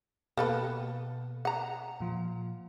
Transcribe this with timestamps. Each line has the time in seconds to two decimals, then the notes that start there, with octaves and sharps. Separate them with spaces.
0.37 B2 A#3 A4 B4
1.45 F#5 A#5
2.00 A#2 F3